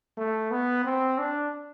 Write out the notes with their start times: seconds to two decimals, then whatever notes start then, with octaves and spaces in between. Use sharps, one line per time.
0.18 A3
0.51 B3
0.85 C4
1.19 D4